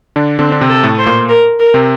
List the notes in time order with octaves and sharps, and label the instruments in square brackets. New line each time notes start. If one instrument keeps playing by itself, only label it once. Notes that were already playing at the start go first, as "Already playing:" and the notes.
[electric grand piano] D3 D4
[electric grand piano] D3 D4 [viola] C4
[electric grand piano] D4
C3 C4
[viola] A4
[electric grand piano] A2 A3
[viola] C5
[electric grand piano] A#2 A#3
[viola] A#4
A#4
[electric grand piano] C3 C4